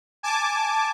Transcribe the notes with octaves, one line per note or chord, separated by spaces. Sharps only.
G#5 A5 D6